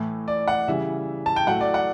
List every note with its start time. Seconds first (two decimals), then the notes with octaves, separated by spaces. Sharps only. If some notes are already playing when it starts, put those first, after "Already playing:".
Already playing: A2 E3 A3
0.28 D5
0.48 F#5
0.68 C#3 E3 G3 E5
1.26 A5
1.36 G5
1.47 A2 F#3 A3 F#5
1.61 D5
1.74 F#5